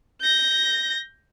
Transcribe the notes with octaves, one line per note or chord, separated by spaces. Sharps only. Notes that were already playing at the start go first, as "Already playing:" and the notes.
G6 A#6